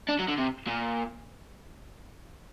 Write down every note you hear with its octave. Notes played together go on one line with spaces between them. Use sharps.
D4
F#3
D3
C3
A#2